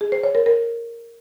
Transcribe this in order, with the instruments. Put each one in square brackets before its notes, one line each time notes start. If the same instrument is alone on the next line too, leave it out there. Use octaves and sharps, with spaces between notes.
[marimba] G#4
C5
C#5
A#4
A#4